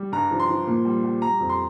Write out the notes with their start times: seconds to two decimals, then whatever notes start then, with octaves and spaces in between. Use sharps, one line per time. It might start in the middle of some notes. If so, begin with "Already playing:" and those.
Already playing: G3
0.12 G2 A#5
0.31 F3
0.40 C6
0.49 F3
0.67 A#2
0.85 G3
1.04 G3
1.22 G3 A#5
1.40 F2
1.49 C6